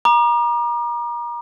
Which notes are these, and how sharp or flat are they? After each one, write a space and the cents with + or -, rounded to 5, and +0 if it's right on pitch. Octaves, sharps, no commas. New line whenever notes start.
A#5 +30 D6 +40